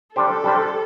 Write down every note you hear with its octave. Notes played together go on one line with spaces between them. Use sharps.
G3 D4 G4 A4 C5
G3 D4 G4 C5